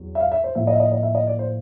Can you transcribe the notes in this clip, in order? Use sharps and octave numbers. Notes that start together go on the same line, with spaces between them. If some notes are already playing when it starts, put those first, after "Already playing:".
Already playing: E2 F#3
E5
F5
E5
C5
A2 F3 A#3 E5
D#5
E5
D#5
D#5
E5
D#5
D5
C5